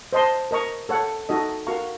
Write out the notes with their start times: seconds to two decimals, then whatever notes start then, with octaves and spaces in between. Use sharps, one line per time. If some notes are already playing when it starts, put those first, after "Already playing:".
0.13 C5 D#5 A5 C6
0.51 A#4 D#5 A#5 C#6
0.89 A4 C#5 F#5
1.29 D#4 F#4 A4 D#5
1.67 F#4 A#4 F5 A#5 C#6